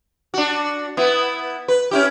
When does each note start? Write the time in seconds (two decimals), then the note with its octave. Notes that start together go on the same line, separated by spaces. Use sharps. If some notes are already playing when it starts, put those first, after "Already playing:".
0.34 D4 F#4
0.97 B3 E4
1.68 B4
1.91 C#4 E4 G4